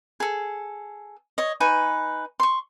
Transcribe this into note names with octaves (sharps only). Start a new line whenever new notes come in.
G#4 A4
C#5 D#5
D#4 B4 G#5 C#6
C6 C#6